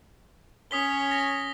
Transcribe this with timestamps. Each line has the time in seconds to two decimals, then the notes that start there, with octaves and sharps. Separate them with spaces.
0.71 C#4 C#5 D#6 B6 G7
1.11 A#6